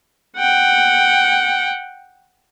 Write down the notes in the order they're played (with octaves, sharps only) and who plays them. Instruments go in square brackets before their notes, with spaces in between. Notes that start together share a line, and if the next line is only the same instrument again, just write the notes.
[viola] F#5 G5